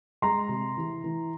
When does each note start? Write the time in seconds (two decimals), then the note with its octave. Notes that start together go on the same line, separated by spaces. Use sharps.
0.22 G#3 A#5 C6
0.49 C3
0.77 E3
1.04 E3